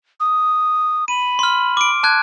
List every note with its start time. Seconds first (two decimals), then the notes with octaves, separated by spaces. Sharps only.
0.20 D#6
1.08 B5 D#7
1.39 C6 F6
1.77 D6 D7
2.03 A5 F#6 G#6